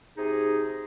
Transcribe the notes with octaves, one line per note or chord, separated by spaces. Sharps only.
C3 D#4 G#4